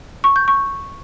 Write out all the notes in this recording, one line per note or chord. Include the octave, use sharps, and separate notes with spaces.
C#6
G6
C#6